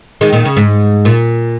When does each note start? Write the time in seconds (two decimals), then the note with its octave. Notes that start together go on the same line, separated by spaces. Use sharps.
0.21 D#3 G#3
0.32 A#2 D#3
0.45 C#3
0.57 G#2
1.05 A#2